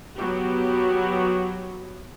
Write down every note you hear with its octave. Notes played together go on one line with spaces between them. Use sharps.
F#3 B3 F#4 G4